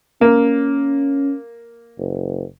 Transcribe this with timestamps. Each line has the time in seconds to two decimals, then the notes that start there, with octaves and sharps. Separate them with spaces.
0.21 A#3 C#4
1.98 F#1